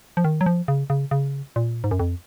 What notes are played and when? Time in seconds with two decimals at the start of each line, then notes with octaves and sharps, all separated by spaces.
0.17 F3
0.24 D#3
0.41 F#3
0.46 F3
0.68 C#3
0.90 C#3
1.11 C#3
1.56 A#2
1.84 G#2
1.91 F#2
2.00 F2